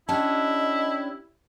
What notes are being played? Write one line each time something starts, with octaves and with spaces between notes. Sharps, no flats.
C#4 D4 E4 G4 D#5 A5